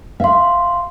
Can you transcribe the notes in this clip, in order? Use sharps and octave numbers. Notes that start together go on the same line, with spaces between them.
E5 F5 C6